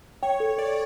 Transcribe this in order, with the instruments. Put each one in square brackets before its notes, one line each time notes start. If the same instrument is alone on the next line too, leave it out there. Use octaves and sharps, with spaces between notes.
[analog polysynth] C#5 [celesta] G5
[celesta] A4
[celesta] A4 [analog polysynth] D5